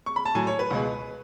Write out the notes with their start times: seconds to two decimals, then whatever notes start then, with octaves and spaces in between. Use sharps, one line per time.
0.06 C#6
0.16 B5
0.25 A5
0.35 A2 F#3 G#5
0.47 C#5
0.59 B4
0.71 C#2 B2 G#3